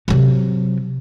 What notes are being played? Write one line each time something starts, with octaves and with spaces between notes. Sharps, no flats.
C3 F#3